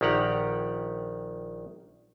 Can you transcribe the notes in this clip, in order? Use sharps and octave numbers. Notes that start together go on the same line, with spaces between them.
A#1 D#3 G4 F#5 A#5